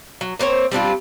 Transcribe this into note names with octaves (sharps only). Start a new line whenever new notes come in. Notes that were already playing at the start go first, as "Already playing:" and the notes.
F#3
A#3 C4 C5 C#5
G3 C4 D4 F4